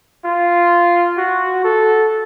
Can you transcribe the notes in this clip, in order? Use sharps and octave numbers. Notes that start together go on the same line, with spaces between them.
F4
F#4
A4